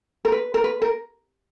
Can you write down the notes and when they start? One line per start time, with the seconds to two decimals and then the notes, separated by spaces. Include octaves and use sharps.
0.25 A#4
0.32 B4
0.54 A#4
0.64 B4
0.82 A#4